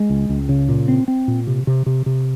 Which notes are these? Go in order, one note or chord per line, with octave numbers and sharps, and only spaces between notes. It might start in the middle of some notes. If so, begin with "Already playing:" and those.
Already playing: G#3
C#2
C#2
C#3
A#2
C4
C4
A#2
C3
C3
C3
C3